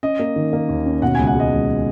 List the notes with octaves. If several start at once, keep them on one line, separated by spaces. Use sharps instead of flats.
C#4 D#5
A#3
D#3
A#3
D#2
C#4
B2 F#5
C#2 G#5
F#5
G#3 D#5
C#2